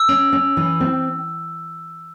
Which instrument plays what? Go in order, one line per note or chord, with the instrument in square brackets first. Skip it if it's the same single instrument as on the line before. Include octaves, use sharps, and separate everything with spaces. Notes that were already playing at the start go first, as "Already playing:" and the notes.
Already playing: [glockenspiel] E6
[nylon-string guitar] C#4
C#4
E3
C4